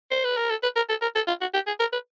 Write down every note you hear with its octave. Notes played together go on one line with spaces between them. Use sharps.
C5
B4
A#4
A4
B4
A#4
A4
A#4
A4
F4
F#4
G4
G#4
A#4
B4